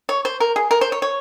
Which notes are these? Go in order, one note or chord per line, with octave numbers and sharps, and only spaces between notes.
C#5
C5
A#4
G#4
A#4
C5
C#5
C#5